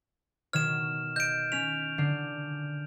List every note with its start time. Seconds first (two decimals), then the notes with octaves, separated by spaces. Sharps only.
0.53 B2 D#3 C#5 F6 E7
1.16 D#5 G6 D7
1.52 C#4 B6 F7
1.98 D3 D4 C7